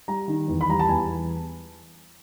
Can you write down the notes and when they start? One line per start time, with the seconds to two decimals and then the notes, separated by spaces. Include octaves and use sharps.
0.08 G3 A#5
0.28 D#3
0.48 E2
0.61 B5
0.69 G3 A#5
0.79 A5
0.89 E2 G#5